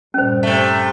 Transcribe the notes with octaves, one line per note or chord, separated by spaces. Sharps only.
G2 A#2 G3 C#4 C5
C3 A3